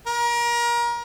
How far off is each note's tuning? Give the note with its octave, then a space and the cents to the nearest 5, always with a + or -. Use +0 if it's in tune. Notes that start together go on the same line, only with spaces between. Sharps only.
A#4 +30